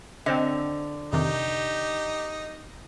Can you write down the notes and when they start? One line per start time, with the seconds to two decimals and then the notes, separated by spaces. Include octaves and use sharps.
0.26 D3 C4 C5 D#5
1.13 F2 C3 D#3 D#4 G4